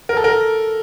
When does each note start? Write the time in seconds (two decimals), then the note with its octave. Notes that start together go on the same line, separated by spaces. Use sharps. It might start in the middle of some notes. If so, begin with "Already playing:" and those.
0.09 A#4
0.17 A4
0.24 A#4